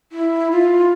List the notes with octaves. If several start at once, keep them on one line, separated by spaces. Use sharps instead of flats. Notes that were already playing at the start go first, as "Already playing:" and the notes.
E4
F4